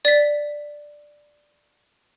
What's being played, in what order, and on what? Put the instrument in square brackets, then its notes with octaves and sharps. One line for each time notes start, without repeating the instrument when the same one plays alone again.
[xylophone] D5 B6